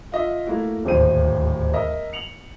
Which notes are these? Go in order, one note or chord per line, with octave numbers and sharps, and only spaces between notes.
F4 D#5 E5
A3 A#3 E4 F#4
D1 G#1 D#2 G#3 C5 D#7
A#4 D#5 E5 A#5
C#7 F7 F#7